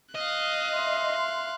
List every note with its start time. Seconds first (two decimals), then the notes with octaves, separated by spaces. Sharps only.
0.15 D#5 F5 F#6
0.74 E5 C6